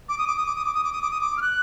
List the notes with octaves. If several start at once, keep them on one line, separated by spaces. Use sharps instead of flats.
D6
D#6
D6
D#6
D6
D#6
D6
D#6
D6
D#6
D6
D#6
D6
F6
F#6